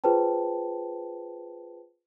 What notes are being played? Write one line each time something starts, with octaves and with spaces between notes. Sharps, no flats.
F4 G#4 B4 C5 G5 A5